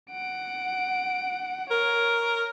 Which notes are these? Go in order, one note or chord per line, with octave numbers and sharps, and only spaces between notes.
F#5 D7
A#4 C#5